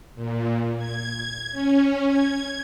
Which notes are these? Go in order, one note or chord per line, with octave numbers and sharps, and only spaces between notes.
A#2
G#6
C#4
G#6